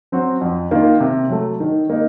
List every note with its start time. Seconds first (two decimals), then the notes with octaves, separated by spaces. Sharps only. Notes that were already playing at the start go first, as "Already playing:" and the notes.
0.12 F#3 C4 F#4
0.41 F2
0.71 D#3 A#3 F4
1.00 C3
1.30 F#3 A3
1.60 D#3
1.90 A#3 D#4